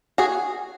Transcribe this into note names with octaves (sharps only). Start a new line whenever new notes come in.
F#4 G#4